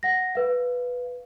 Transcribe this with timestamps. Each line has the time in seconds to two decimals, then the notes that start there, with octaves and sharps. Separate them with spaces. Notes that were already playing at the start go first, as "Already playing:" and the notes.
0.03 F#5 A#6
0.35 B4 F5